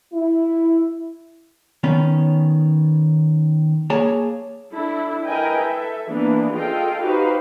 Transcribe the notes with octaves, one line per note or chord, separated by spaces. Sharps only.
E4
D#3 B3 C#4
A#3 G#4 C#5 G#5 A5
D4 E4 A4
E4 A#4 B4 D#5 G5 G#5
A4 E5
E3 A#3 B3 D4
F4 G#4 A4 D#5 F5 G5
D#4 F#4 G4 B4 C5 F5